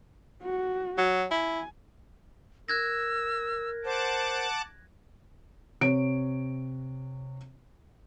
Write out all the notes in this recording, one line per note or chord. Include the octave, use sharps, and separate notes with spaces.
F#4
F#3
E4 G#5
A#4 E6 F#6 G#6 A#6
C5 F#5 A5 D6
C3 C#5 D7